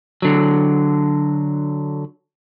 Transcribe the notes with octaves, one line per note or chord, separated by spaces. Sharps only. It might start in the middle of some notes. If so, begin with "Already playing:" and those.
D3 F#3